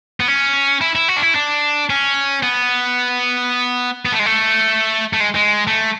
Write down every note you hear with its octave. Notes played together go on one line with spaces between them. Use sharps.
B3
C#4
E4
E4
F#4
D4
E4
D4
C#4
B3
B3
A3
G#3
A3
A3
G#3
G#3
A3